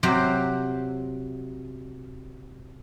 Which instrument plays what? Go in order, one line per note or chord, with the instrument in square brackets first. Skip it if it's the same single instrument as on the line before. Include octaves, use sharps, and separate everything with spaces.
[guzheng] C3 F#3 C5 G5